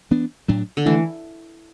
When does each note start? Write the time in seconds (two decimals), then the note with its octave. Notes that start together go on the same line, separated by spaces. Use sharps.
0.11 E3 B3 D4
0.48 A2 F#3 D4
0.77 D3
0.86 E3 A3 D4